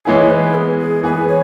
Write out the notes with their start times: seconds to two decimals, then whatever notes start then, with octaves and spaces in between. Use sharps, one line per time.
0.05 E3 G#3 B3 E4 G#4 C#5
0.30 B4
0.55 G#4
0.79 G#4
1.03 E3 B3 G#4 B4
1.28 C#5